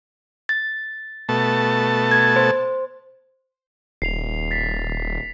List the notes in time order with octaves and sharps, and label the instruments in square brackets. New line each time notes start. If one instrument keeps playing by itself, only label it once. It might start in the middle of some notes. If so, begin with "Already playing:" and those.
[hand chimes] A6
[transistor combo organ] B2 A3 A5
[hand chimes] G#6
C5
[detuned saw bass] D#1 [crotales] C7 F7
[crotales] A6 B6